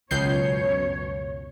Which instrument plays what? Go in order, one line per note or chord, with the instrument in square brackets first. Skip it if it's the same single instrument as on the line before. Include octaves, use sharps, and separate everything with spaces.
[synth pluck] C#2 G6 C7 [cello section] F#2 B2 C#5